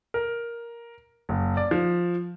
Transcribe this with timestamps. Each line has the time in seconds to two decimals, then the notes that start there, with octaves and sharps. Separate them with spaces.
0.14 A#4
1.29 F#1
1.57 D5
1.71 F3